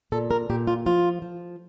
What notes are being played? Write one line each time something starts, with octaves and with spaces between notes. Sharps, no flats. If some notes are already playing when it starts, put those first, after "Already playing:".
A#2 A4
A#4
A#2 G4
F4
F3 F4
F3